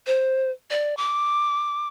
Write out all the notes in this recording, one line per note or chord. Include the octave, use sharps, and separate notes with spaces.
C5
D5
D6